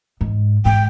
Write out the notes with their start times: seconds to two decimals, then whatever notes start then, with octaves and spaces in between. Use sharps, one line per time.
0.21 G#2
0.65 G#2 G5